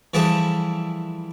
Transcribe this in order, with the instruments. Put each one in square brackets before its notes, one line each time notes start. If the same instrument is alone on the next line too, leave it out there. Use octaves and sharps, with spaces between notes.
[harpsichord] E3 F3 G3 E4 G#4 A4